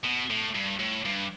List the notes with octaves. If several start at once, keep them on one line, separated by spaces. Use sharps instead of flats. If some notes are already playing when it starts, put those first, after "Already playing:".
B2
A2
G2
A2
G2